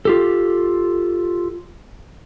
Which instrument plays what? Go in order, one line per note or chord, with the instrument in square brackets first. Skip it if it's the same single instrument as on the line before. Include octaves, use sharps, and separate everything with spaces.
[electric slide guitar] F4 G4 A4